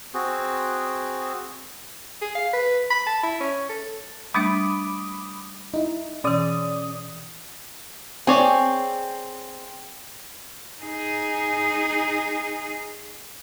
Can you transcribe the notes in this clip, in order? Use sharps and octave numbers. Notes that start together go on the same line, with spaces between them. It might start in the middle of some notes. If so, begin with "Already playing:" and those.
C4 F#4 G#4
G#4
F5
B4
B5
A5
E4
C#4
A4
G3 A3 D4 B5 D6 D#6
D#4 E4
B2 E3 C#4 D5 D#6
C4 G#4 C#5 D5
D#4 G#4